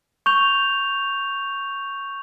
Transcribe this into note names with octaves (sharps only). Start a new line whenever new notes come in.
C#6 G6 F7